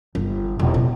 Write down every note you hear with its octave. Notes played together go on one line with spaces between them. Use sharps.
G1
E1
B2